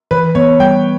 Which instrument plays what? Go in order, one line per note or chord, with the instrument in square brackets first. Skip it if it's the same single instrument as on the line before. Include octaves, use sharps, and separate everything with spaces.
[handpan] E3 [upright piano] B4
[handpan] B3 [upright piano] C#5
[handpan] G3 [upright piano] G5